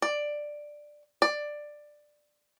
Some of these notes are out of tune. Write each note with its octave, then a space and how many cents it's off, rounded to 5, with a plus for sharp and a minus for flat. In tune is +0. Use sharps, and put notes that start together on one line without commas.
D5 +10
D5 +10